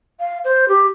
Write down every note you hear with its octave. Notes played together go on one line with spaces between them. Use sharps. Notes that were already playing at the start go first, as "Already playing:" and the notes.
F5
C5
G4